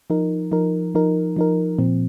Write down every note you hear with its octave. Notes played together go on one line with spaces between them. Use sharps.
F3 D#4 A#4
F3 D#4 A#4
F3 D#4 A#4
F3 D#4 A#4
A#2 F3 C4